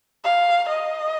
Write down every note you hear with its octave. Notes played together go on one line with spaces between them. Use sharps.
F5
D#5